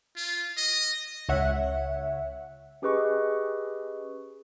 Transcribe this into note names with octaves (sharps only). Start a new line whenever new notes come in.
F4
D#5
C#2 C#5 E5 F#5
C#4 G4 G#4 B4 D#5 C#6